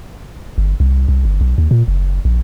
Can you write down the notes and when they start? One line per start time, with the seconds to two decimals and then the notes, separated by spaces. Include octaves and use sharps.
0.58 G1
0.80 C2
1.09 C2
1.25 G1
1.41 B1
1.58 D#2
1.71 A#2
1.88 F#1
2.25 A#1